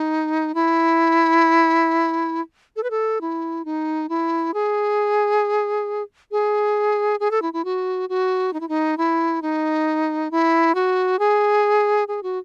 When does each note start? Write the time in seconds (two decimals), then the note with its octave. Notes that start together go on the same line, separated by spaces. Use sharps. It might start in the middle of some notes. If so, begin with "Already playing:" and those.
Already playing: D#4
0.55 E4
2.76 A4
2.83 B4
2.91 A4
3.21 E4
3.65 D#4
4.09 E4
4.54 G#4
6.32 G#4
7.20 G#4
7.31 A4
7.42 E4
7.53 E4
7.65 F#4
8.09 F#4
8.53 D#4
8.61 E4
8.69 D#4
8.98 E4
9.42 D#4
10.31 E4
10.75 F#4
11.19 G#4
12.08 G#4
12.23 F#4